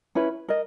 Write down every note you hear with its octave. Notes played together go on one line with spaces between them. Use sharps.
C#4 E4 B4
A#4 D#5